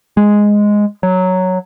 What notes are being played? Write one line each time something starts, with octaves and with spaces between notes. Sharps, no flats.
G#3
F#3